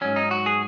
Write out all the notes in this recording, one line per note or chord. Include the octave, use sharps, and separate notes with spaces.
G#2 F#3 C#4
D#4
F#4
G#4